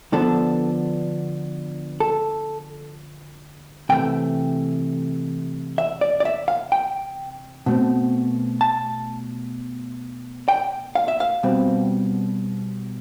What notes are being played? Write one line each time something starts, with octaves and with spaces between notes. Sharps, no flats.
D3 F3 B3 D4 A4
A4
C3 E3 A3 G5
E5
D5
D5
E5
F5
G5
B2 A3 C4
A5
G5
F5
E5
F5
B2 G3 C4